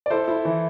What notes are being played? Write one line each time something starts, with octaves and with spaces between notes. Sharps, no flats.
D5
E4 A4 C5
E4
E3